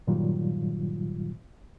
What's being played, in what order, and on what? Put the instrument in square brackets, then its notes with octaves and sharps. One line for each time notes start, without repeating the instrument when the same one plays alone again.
[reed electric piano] G2 A#2 D#3 F#3 G3 F4